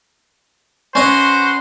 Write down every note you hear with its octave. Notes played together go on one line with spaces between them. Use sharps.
C#4 F#4 B4 C5 D#5